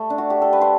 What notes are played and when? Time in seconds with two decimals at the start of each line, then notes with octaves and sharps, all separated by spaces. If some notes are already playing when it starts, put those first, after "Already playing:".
Already playing: A3
0.10 D4
0.18 F#4
0.30 G4
0.42 A4
0.53 B4
0.61 C5